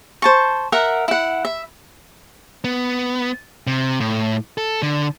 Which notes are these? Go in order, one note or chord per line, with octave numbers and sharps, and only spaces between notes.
C5 A5 C#6
A#4 E5 F#5
E4 F#5
E5
B3
C3
A2
A4
D3